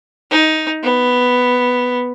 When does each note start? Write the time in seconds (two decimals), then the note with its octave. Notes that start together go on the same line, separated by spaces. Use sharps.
0.31 D#4
0.83 B3